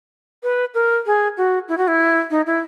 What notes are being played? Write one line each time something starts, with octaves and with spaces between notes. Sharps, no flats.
B4
A#4
G#4
F#4
E4
F#4
E4
D#4
E4